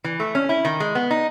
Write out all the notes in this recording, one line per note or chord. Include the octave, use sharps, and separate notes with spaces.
E3
A3
C#4
E4
D#3
G#3
B3
D#4